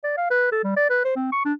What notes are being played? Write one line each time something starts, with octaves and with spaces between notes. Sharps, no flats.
D5
F5
B4
A4
G3
D5
B4
C5
C4
C#6
D4